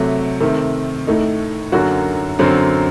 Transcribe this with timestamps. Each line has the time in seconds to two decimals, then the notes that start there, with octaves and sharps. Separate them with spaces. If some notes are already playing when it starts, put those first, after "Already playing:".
Already playing: C3 F#3 A3
0.40 C3 D#3 A3
1.07 A2 A3 D#4
1.72 F#2 D3 F#3 A#3 F#4
2.39 F#2 D3 F#3 C4